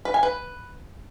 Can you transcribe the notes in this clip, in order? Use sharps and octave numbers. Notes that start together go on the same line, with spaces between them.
B4
G#5
B4